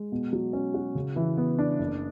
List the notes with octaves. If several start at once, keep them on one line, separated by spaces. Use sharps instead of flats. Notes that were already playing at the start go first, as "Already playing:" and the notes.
Already playing: G#3
B2
F#3
C#4
F#4
C#3
E3
B3
D4
F#1